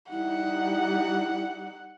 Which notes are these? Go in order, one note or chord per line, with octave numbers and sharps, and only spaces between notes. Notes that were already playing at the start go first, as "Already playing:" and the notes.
G3 D#4 E4 F#5